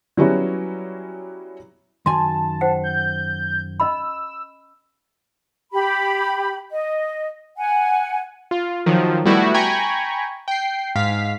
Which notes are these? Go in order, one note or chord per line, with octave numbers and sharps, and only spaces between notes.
F#3 G3 B3 C#4 E4 F#4
F#2 D#3 G#5 A5 C6
C5 F#5 G5
G6
C#4 D#5 B5 E6
G4 B5
D#5
F#5 G#5
F4
D#3 F3 F#3
G3 A3 B3 E4 F#4
G5 G#5 A#5 B5 C#6 G#6
G5 C7
G#2 F5 B6